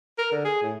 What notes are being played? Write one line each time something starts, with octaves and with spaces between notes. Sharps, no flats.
A#4
D3
G#4
A2